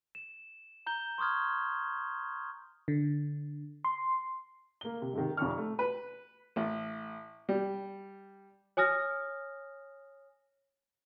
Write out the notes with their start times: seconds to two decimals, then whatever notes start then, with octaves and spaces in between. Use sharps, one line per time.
0.15 E7
0.86 A#5 G6 G7
1.18 C6 C#6 D#6 F6 G#6
2.88 D3
3.85 C6
4.81 A#3 G7
5.02 C3
5.13 G#2 C3 D#3
5.37 F1 F2 C#6 F6
5.58 A3
5.79 B4
6.56 A1
7.49 G3
8.77 C#5 G#5 D#6 F6 A#6